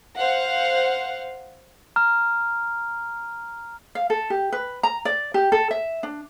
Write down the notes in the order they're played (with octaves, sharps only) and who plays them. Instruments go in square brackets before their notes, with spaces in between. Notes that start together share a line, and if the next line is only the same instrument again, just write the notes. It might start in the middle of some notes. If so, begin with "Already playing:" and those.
[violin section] C5 F5 F#5
[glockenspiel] A#5 F6
[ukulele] F5
A4
G4
B4
A#5
D5
G4
A4
E5
D4